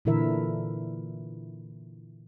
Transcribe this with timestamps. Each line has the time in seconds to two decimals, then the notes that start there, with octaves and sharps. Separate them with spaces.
0.05 A#2 D3 E3 E4 A#4 E5